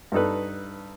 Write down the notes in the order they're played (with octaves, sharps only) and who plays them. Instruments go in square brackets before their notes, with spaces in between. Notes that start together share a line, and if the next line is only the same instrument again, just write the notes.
[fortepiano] G2 D4 D#4 A4 B4